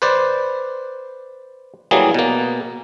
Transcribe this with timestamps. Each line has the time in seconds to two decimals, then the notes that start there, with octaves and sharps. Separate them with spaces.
0.02 B4 C5 D5
1.91 E3 F#3 G3 A#3 G#4
2.14 B2 A#3